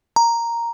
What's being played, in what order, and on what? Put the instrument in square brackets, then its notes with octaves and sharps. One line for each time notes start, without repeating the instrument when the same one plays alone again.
[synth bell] A#5